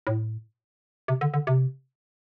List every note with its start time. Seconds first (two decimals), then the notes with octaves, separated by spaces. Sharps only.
0.07 A2
1.08 C3
1.21 D3
1.34 D3
1.47 C3